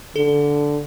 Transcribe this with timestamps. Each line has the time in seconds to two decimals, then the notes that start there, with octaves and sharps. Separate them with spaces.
0.16 D3 A4